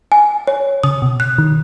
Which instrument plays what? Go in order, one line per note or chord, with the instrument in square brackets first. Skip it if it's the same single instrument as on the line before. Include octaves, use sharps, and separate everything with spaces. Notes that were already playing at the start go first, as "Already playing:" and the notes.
[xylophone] G#5
C#5
[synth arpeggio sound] C#3 [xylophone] D#6
[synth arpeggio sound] B2
[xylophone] F#6
[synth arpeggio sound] D#3